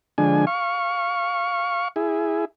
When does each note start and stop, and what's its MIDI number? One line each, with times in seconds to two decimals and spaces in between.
0.18 0.45 50
0.18 0.45 53
0.18 0.45 56
0.18 0.45 62
0.18 0.45 80
0.47 1.88 77
0.47 1.88 85
1.96 2.45 64
1.96 2.45 68